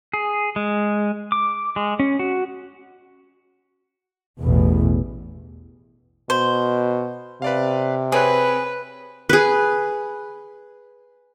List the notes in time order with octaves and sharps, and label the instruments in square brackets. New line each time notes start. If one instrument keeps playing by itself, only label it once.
[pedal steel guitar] G#4
G#3
D6
G#3
C#4
F#4
[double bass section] A1 E2 B2
[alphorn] B2 [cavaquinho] C5
[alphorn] C3 [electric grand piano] B4 D5 F5
[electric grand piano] C4 C#5 F#6 [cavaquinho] G#4 [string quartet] B4
[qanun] G#4 B4